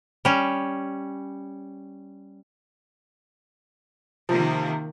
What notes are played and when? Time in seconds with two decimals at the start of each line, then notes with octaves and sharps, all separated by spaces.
0.25 G3 C#4
4.29 C3 D#3 F3 A#3